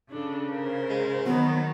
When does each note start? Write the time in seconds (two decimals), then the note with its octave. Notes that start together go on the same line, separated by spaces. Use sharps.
0.11 C#3 D4 A4
0.51 A#4 C5
0.89 G#3
1.26 D#3 F#3 B3